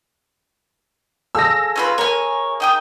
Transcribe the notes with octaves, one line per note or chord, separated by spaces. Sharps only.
G#4 A4 F5 E6 A#6
C#4 F4 B4
A#4 C#5 G#5
D#4 G5 D#6